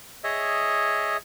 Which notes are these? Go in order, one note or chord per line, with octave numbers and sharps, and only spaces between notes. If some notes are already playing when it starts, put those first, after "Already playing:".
G#4 C#5 D#5 E5